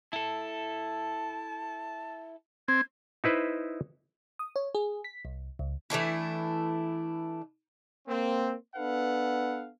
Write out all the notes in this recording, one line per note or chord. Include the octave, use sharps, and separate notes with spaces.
E4 A4 A5
C4 G#6
D#4 E4 B4 C5
D#6
C#5
G#4
B6
C2
C#2
E3 A3 D4 E4
A#3 C4
B3 D4 A4 B4 F5 F#5